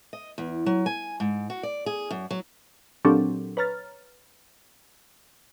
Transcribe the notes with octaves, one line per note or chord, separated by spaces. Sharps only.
D#5
E2
F#3
G#5
G#2
F#4
D5
G#4
F#2
F#3
A#2 F#3 C4 D4 G4 A4
B4 C#5 A#5 F6 A6